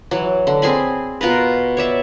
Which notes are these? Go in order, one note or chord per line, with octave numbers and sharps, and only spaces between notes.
E3 F#3
D3
C4 G#4 G#5 B5
B2 F4 A#4 B4
C#5 D5 E5